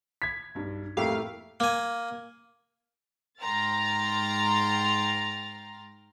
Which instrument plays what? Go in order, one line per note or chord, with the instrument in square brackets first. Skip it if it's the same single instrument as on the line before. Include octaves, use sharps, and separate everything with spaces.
[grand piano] G#6 B6
[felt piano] B1 G2
[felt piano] F2 A2 [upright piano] A3 A#3 E4 [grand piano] G4 [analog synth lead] F5
[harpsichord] A#3 G#5
[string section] G#2 G5 A#5 C6 F6 A6